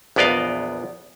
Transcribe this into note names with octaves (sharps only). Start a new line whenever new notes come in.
A#1 E2 B3 D5 D#5 F5